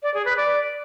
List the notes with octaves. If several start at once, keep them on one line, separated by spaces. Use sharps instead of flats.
D5
G#4
B4
D5